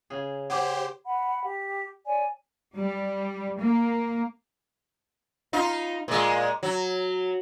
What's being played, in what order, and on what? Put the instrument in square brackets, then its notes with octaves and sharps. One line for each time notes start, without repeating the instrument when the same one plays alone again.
[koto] C#3 G#4
[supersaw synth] G4 C5 [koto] G#4 [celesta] F#5 D6
[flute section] F#5 B5
G4
C#5 D5 G#5
[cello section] G3
A#3
[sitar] D#4 F4
A#2 G#3
F#3